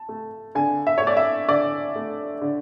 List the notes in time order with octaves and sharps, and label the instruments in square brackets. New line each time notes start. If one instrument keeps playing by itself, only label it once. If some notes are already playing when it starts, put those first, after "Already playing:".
Already playing: [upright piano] A5
A3
D3 G#5
E5
A3 C#5
D5
E5
D3 D5
A3
D3